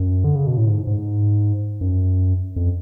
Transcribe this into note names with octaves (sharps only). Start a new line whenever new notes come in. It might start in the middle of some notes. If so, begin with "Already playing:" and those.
Already playing: F#2
D3
C#3
B2
A2
G#2
G#2
F#2
F2